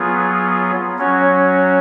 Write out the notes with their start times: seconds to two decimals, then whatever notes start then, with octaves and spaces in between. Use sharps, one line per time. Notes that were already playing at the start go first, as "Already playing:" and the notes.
Already playing: F#3 B3 F4 G#4
0.98 F#3 C#4 F#4 C#5